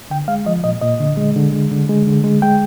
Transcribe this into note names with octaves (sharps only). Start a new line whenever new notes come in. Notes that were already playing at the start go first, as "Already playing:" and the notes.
D3 G5
G#3 F5
F3 D#5
A#2 D#5
A#2 D#5
D3
G#3
D3
G#3
D3
G#3
D3
G#3
G#3 G5